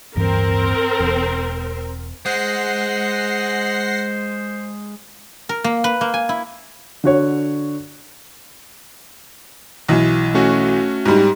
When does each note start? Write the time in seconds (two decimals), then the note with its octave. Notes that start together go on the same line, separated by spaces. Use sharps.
0.16 D1 G2 E3 C4 A#4
1.00 E1
2.26 G#3 C5 F#5 A#6 C7
5.49 A#4
5.64 A#3
5.84 B4
6.01 A#3
6.14 G#5
6.29 E4
7.04 D3 F#4 C#5
9.89 B1 E3
10.35 A3 C#4 F#4
11.05 G#2 G3